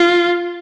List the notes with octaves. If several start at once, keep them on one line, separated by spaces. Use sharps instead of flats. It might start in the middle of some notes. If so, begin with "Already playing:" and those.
Already playing: F4